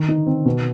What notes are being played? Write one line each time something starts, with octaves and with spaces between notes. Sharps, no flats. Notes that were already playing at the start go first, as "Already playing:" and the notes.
Already playing: D#3
D#4
C4
B2